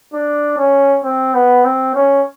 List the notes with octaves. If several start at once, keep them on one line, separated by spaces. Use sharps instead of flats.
D4
C#4
C4
B3
C4
C#4